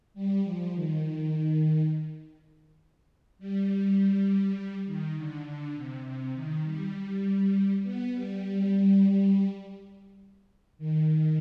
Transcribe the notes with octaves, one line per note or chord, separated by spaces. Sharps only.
G3
F3
D#3
G3
D#3
D3
D3
C3
C3
D#3
G3
B3
G3
D#3